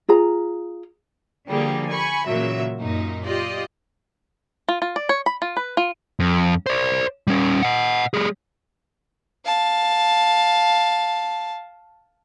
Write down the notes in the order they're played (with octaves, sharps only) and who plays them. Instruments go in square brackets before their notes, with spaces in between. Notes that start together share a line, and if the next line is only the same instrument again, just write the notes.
[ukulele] F4 G#4 A#5
[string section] D3 F3 G3 A#3 G#4
G#5 B5 C#6
A#2 C#3 E3 F#3 A#3 E5
F#2 A#2 D#4
F4 G4 D5 D#5
[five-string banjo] F4
F4
D5
C#5
B5
F4
B4
F4
[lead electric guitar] F2
C5 D5
G3 C#4
D#5 F#5
G3 G#4
[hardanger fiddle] F5 A5